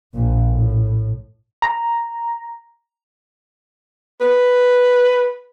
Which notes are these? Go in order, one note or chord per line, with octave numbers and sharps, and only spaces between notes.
A#1 A#2
A2
A#5
B4